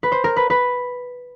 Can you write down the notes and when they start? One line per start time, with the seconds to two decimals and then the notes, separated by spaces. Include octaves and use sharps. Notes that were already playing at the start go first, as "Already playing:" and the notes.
0.03 B4
0.12 C5
0.24 A#4
0.37 B4
0.50 B4